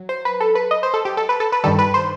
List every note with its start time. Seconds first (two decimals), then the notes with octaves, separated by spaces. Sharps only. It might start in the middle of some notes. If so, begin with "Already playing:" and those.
Already playing: F#3
0.09 C5
0.25 B4
0.40 A4
0.55 B4
0.71 D#5
0.83 C5
0.94 A4
1.05 G4
1.17 A4
1.29 B4
1.40 A4
1.52 B4
1.64 G2 D#3 G3 A4
1.79 B4
1.94 C5